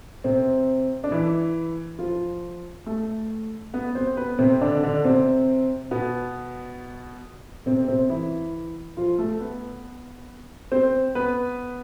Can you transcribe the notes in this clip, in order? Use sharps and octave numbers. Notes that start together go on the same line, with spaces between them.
C3 C4
D4
E3 E4
F3 F4
A3 A4
B3 B4
C4 C5
B3 B4
C3 C4
D3 D4
D3 D4
C3 C4
B2 B3
C3 C4
C3 C4
E3 E4
F3 F4
A3 A4
B3 B4
C4 C5
B3 B4